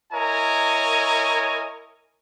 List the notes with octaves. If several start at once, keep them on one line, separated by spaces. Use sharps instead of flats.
E4 A#4 C#5 D#5 G#5 A#5